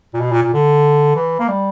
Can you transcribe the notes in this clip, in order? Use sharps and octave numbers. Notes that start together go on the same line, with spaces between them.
A#2
B2
A#2
A#2
D3
E3
A#3
G3